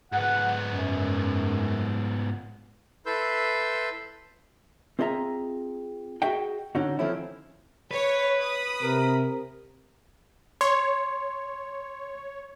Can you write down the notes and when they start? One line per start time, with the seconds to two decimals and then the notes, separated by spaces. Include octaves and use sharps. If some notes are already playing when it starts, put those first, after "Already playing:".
0.12 G#2 B3 F#5
0.71 F#2
3.06 E4 A4 B4 C6 E6 G6
4.99 C4 F4 G#4 D#5 E5 A#5
6.22 F#4 G#4 D#5 E5 G5
6.75 D3 C#4 D#4 F#4
6.99 D#3 F3 A3 C4 C#4 E4
7.91 B4 C#5
8.37 B5 D#6
8.83 C3 A#4
10.61 C#5 C6